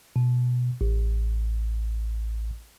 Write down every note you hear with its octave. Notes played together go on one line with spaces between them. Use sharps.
B2
A1